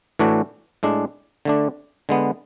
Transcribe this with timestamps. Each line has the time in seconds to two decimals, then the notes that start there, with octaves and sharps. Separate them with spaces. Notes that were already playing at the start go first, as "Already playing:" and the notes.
0.19 A2 E3 A3 D4 F#4
0.83 A2 G#3 D4
1.45 D3 A3 D4
2.09 D3 G#3 B3